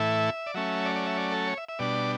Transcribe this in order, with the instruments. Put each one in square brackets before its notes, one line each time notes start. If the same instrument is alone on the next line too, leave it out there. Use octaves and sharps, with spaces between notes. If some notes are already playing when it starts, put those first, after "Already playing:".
Already playing: [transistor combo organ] A2 E3 A3 E4 E5
D5
F#3 A3 C#4 E5
D5
D5
E5
D5
A4
C#5
E5
E5
B2 G3 D4 D5